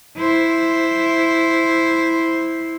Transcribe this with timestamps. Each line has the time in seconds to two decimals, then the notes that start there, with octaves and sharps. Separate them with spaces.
0.17 E4 C5